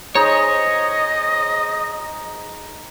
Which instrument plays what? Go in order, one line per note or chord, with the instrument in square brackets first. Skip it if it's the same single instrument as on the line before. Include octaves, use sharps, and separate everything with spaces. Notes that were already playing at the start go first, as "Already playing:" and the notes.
[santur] D#4 G#4 C5 [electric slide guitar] C#5 [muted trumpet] D#5